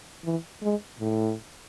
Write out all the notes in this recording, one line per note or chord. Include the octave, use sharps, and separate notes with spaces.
E3
G#3
A2